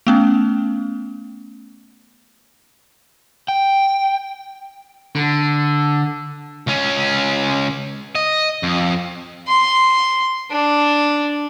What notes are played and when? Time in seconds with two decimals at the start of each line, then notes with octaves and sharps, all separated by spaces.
0.07 A3 B3 C#4
3.48 G5
5.15 D3
6.67 C#2 C#4
8.15 D#5
8.63 F2
9.48 C6
10.51 D4